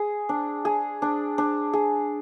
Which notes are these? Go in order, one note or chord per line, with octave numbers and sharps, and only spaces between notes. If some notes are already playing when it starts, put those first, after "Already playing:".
Already playing: G#4
D4
G#4
D4
D4
G#4